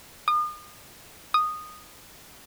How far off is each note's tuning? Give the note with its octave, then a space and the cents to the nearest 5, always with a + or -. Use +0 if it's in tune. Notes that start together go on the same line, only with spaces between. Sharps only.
D#6 -40
D#6 -10